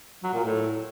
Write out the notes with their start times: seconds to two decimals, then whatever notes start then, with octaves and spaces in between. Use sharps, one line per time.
0.23 F#3
0.34 A#2
0.44 A2